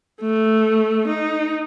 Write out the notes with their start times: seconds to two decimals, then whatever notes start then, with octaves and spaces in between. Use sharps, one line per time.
0.21 A3
1.08 D#4